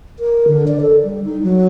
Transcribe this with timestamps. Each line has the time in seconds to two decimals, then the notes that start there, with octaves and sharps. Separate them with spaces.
0.19 A#4
0.47 D3
0.67 D5
0.81 A4
1.04 G3
1.25 D#4
1.43 F#3